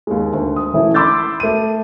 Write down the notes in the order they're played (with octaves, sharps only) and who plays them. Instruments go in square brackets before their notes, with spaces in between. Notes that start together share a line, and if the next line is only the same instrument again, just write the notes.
[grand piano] D#2 G#3
D2
D#6
E3 A3 C#4 E4
B5 C6 D6 E6 G6 A6
A3 D#7